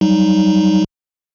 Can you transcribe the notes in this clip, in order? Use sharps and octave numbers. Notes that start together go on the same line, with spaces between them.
F#3 G3 D#4